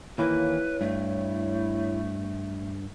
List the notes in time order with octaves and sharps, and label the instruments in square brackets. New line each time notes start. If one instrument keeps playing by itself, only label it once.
[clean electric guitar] D#2 E3 A#3 [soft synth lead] E4 [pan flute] B4 [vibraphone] C#5
[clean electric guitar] G2 [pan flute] A3